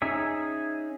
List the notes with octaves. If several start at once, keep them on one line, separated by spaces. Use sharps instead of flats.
C#4 D#4 G#4 E5